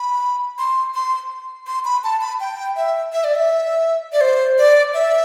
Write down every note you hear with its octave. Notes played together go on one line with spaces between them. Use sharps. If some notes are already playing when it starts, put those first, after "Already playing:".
Already playing: B5
C6
C6
C6
B5
A5
B5
G5
E5
E5
D5
E5
D5
C5
D5
E5